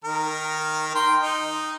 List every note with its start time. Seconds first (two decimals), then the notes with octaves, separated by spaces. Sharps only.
0.04 D#3 A#4
0.95 G5 C6
1.22 D#4